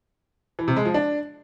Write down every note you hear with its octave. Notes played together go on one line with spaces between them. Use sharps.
E3
C3
G#3
F3
D4